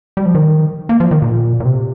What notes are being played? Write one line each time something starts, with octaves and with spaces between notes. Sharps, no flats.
G3
F3
D#3
A#3
F3
D#3
A#2
A#2
C3